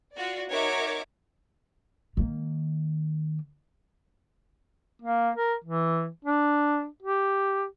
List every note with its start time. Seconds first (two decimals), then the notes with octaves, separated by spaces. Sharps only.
0.15 F4 F#4 D5
0.51 D#4 F#4 A#4 C#5 E5 D6
2.17 D#3 A#3
5.02 A#3
5.35 A#4
5.64 E3
6.25 D4
7.02 G4